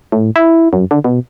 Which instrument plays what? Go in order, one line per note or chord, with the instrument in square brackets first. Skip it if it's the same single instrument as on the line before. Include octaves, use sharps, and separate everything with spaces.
[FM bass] A2
E4
F#2
D3
B2